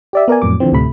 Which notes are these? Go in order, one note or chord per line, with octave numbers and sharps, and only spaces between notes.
G4 D5 E5
B3 A#4 D5 G#5
F2 A2 F#3 D6
D3 E3 F3 C4
D2 A2 C3 A3 B5